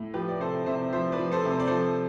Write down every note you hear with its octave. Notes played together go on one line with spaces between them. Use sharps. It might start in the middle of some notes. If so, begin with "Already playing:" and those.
Already playing: A2
F3 G4 B4
D5
C3 A4 C5
C3 C5 E5
F3 C5 E5
B4 D5
F3
A4 C5
C3
C5
D5
F3 A4 C5